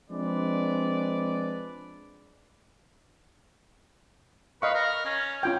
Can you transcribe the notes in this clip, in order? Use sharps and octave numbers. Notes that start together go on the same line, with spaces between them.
F3 G#3 C4 D4 B4 D5
B4 D#5 F5 C#6
A#4
C#4
C#4 F4 G5